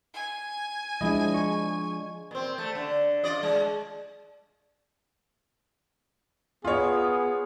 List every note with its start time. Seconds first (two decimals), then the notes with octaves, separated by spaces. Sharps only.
0.13 G#5
1.01 F3 G#3 D4 E4 D#5
1.34 C#6
2.31 A#2 C4
2.58 A3
2.75 D3
3.24 F4 D5 D#5
3.43 G#3
6.65 B3 F4 G#4 C#5